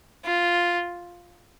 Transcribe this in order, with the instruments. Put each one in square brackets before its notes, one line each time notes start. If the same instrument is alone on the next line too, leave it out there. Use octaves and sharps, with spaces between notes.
[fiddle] F4